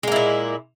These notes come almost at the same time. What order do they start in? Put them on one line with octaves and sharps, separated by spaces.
G#3 A#3 E4 A#2